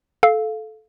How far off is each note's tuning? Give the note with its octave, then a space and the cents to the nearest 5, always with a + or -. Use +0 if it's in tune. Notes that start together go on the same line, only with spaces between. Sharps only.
A4 -15 F5 +0